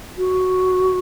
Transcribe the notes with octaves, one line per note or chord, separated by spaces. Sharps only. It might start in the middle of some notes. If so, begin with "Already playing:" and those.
F#4